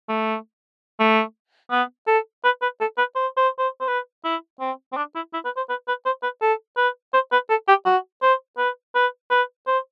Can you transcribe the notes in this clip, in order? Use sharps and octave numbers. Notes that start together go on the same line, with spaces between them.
A3
A3
B3
A4
B4
B4
A4
B4
C5
C5
C5
C5
B4
E4
C4
C4
D4
E4
E4
B4
C5
B4
B4
C5
B4
A4
B4
C5
B4
A4
G4
F#4
C5
B4
B4
B4
C5